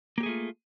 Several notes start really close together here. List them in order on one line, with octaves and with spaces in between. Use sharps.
A#3 G4 G#4 A3 F4